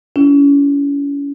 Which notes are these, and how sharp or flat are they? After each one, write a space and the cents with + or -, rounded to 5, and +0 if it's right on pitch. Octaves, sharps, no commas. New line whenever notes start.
C#4 +35 E4 +35